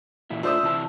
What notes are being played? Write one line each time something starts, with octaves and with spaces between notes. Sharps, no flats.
A#2 E3 E4
A3 D4 F4 C5 E5 D#6
C3 E3 A5